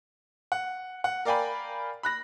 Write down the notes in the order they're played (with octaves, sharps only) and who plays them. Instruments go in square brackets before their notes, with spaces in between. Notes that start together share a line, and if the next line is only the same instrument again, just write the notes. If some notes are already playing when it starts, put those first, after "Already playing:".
[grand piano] F#5
F#5
A#4 D5 F5 G5 G#5 B5
B5 F#6 A#6